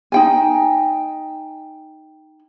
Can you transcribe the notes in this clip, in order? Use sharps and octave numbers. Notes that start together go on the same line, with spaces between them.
D#4 G5 G#5